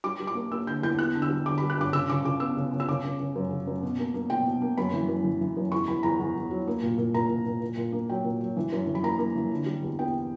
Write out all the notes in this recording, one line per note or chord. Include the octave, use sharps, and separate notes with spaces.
G3 D6
G3
D6
A#3
A#3 E6
D3 G6
E2 G6
B3 F#6
D3
E6
G3
D3 D6
B5
G3
F#6
G2 D6
C#3 E6
C#3 D6
C#3 D6
B3 E6
C#3
C#3
E6
C#3 D6
C#3
C#3
F#2
C#3
F#2
B2
A#3
A#3
B2 G5
B2
A#3
F#2 B5
E3
F#2
E3
E3
F#2
E2 C#6
E2 B5
E2 A#5
E2
E2
F#3
A#3
A#2
A#2
A#2 A#5
A#2
A#2
A#2
A#2
A#3
F#3 G5
A#2
F#3
E3
F#2
E3
B5
A#3 A#5
A#3
E3
D3
G3
E2
B3 G5